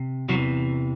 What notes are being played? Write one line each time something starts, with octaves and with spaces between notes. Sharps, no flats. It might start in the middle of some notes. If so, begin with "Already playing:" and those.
Already playing: C3
E2 C3 E3 F#3 F#4